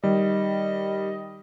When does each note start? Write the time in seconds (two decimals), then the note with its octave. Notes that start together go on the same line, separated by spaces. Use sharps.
0.03 D#3 G3 D#5